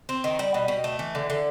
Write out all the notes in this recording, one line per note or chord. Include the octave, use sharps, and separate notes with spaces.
C4
D#3
G3
B2
B2
A3
E3
D3
D3